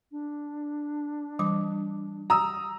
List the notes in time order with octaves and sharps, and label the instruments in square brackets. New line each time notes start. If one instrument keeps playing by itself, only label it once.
[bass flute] D4
[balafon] E3 G3 D6
[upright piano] A#5 D#6 E6